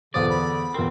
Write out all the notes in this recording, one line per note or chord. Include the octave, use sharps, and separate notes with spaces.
E2 D3 F4 C5 D5 D#6
B5
E2 C4 A#4